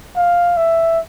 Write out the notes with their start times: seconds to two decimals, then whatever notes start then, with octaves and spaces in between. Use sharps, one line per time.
0.17 F5
0.57 E5